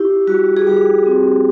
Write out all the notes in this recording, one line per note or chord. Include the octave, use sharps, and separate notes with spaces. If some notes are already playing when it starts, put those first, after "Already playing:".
Already playing: E4 G4
G3 F#4
G#4
G3 G4
C4